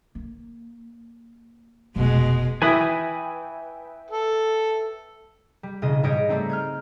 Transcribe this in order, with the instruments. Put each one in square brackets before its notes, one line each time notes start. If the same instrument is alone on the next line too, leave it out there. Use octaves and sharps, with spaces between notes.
[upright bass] A#3
[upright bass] F1 [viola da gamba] B2 G#3
[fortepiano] E3 [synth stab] B4 E5 G5 [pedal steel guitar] G#5 B5 D#6
[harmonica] A4
[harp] G3
E1 C#3 D#5
G#2 G3 C#5 D#5 A#6 D7
G3 A3 C4 D#4
F6 G6 G#6